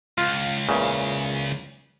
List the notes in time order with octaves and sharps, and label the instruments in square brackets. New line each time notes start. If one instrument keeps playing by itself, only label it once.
[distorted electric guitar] C#2 [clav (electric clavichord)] F4
[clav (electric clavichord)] E2 A#2 C#3